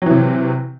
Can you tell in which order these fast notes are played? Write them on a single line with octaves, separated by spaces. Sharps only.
F#3 E3 C3